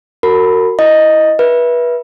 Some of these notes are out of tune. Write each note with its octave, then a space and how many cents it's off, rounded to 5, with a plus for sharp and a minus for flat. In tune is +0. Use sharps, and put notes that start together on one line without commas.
F#4 +0 A#4 -30 B5 +0
E4 +0 D#5 +0
B4 -25 E5 +0